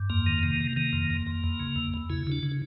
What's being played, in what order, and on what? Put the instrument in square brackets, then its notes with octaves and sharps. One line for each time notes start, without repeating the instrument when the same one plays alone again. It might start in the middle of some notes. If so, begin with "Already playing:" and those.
Already playing: [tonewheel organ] G2
F2 A#3
D#3
C3 A#3
C3
D#3 A#3
F2
F2
F2
E2
C#3
E2
E2
C#3 E4
C#3 D4
C#3